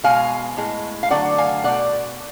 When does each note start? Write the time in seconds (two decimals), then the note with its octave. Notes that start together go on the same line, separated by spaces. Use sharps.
0.04 B2 G#3 F5 G#5
0.57 A2 G#3
1.03 F5
1.11 D3 F#3 A3 D5 F#5
1.38 F5 G#5
1.64 B2 A3 D5 F#5